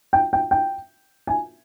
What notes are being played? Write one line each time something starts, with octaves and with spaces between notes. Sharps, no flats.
G5
G5
G5
G#5